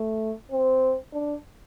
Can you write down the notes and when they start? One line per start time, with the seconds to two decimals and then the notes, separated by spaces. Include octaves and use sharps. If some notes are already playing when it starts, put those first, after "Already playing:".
Already playing: A3
0.52 C4
1.13 D4